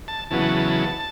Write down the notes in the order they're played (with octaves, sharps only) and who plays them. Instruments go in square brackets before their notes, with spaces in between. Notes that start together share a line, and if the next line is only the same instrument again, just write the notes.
[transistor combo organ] A5
E2 C#3 F#3 B3 A5